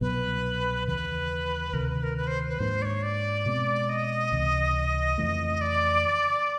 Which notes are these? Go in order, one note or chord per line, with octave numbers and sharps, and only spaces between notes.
C2 B2 F#3 B3 B4
D#2 C#3 E3 B4
D2 C3 D#3 A#4
B4
A#4
B4
C5
B4
G#2 F3 A#3 D4 C5
D5
C#5
D5
B2 G#3 C4
D#5
C#2 C3 E3
F2 C#3 E3 A3
D5